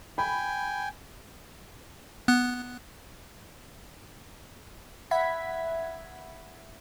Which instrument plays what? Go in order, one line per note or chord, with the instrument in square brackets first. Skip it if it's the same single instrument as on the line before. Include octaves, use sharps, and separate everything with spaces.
[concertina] G5 G#5 [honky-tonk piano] B5
[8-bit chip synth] B3 F#6
[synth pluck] E5 F#5 B5 G#6 B6